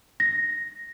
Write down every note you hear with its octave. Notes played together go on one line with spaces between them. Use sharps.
A#6